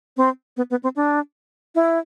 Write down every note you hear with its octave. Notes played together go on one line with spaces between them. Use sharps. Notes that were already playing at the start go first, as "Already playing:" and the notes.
C4
B3
B3
C4
D4
E4